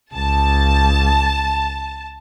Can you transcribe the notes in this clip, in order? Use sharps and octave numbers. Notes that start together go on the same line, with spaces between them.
C#2 A5